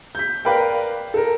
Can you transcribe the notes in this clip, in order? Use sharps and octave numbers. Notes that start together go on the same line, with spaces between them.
G6 B6
A#4 B4 D5 F5 G5
A4 A#4